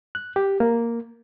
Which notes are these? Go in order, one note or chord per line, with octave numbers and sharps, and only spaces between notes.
F#6
G4
A#3